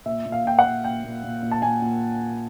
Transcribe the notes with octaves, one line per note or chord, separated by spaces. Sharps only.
A#2 E5
A#2
F5
A#2 G5
F#5
A#2
A#2 G5
A#2
A#2
A#2
A5
A#2 G#5
A#2